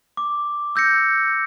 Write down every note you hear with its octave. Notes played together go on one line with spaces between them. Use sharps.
D6
E6 G6 A#6 C#7